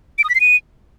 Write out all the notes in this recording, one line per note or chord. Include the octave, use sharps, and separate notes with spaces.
D7
D#6
B6
C7
D#7